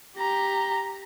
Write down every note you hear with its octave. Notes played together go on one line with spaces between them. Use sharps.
G4 A#5